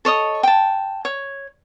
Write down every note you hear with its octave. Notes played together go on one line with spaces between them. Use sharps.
A4 C#5 D#5 D#6
G5 A5
C#5